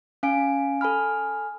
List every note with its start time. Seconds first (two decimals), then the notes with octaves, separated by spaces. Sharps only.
0.23 C#4 F5 G#5 D7
0.81 A4 G#5 B5 F6